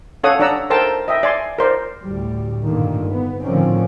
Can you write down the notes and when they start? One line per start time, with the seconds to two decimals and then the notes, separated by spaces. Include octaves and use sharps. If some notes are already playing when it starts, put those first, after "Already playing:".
0.24 C#4 A4 C#5 F5 F#5 D#6
0.40 D4 D5 F#5 A#5 E6
0.70 A4 A#4 C5 G5 A5
1.08 D#5 E5 G5
1.23 D5 G#5 C6
1.58 A#4 C5 D5
2.02 D2 A2 G3
2.66 G2 A#2 D3 D#3 A#3
3.04 B3
3.42 A2 D3 D#3 F3 C4 C#4